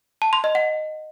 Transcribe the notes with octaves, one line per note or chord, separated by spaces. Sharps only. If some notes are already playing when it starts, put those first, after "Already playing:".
A5
C6
D#5
F#5